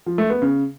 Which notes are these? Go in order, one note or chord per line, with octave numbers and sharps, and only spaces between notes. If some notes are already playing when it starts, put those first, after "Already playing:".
F3
A3
B3
C#3